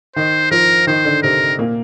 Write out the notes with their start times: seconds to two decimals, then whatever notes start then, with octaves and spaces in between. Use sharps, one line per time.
0.16 D#3 D#4 C5
0.51 F3 F4 A#4
0.87 D#3 D#4 C5
1.05 D3 D4
1.23 C3 C4 A#4
1.59 A#2 A#3